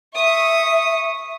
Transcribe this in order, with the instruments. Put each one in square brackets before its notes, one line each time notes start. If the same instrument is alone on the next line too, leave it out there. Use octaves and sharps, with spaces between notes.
[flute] E5 [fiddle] C#6 D#6